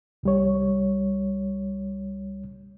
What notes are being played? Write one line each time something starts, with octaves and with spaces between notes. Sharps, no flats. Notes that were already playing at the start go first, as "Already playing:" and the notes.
C2 G3 C#5